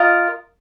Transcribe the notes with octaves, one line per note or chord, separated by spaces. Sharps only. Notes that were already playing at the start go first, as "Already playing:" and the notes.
Already playing: F4 A#4 D#5 F5